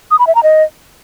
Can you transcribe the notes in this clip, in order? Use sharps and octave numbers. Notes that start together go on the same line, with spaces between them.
D#6
B5
E5
A#5
D#5